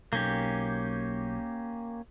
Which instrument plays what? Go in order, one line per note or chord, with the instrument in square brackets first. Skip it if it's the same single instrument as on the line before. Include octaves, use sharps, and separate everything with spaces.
[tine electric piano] B1 G6 G#6 [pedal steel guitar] A#3 C#4 G4